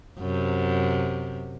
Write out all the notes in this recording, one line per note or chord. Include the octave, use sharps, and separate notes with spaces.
F#2 C3